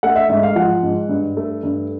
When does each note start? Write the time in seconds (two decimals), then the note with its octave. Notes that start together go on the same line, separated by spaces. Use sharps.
0.03 A3 F#5
0.16 E5
0.29 G#2 E5
0.43 F5
0.56 F3 F#5
0.83 G#2
1.09 G2
1.37 A3
1.63 G2